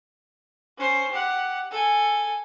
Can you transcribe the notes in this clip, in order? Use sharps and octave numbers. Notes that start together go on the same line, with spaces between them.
C#4 C5
G4 F#5
A4 G#5